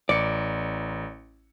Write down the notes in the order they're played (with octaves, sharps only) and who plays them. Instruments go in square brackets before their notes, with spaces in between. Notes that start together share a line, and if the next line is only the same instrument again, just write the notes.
[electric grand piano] A1 C#7 [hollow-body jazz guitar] D5